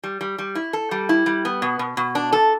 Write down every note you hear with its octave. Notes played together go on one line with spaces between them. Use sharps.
G3
G3
G3
E4
A4
G3
E4
G3
B3
B2
B2
B2
D4
A4